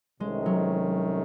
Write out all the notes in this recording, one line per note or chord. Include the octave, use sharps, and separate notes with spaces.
C2 C3 D#3 G#3 A3 C#4
F#3